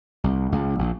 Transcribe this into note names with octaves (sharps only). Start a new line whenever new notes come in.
C2
C#2
A#1